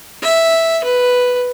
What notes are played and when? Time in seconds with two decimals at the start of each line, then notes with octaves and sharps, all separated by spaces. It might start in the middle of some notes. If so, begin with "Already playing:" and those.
0.23 E5
0.84 B4